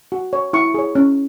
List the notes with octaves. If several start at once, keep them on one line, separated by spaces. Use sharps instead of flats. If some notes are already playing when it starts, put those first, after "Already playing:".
F#4
C#5
E4 C#6
G#4 C#5
C#4